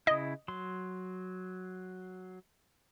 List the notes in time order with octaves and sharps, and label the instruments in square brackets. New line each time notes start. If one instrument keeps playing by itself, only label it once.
[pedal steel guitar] C#3 E4 [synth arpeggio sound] D#5
[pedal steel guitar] F#3 C6